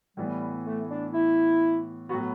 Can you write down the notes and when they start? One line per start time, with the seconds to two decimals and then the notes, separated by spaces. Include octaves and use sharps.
0.17 A2 E3 G3 B3
0.65 A3
0.89 D4
1.13 E4
2.09 A2 F#3 B3 F#4